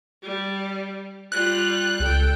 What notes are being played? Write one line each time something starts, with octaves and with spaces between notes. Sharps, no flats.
G3
G3 F4 F#6
C#2 A4 G5